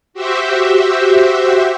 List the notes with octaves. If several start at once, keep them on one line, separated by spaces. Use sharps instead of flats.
F#4 G4 C5 E5